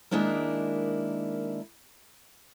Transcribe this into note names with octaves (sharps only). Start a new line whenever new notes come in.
D#3 G#3 A#3 D4 E4 A#4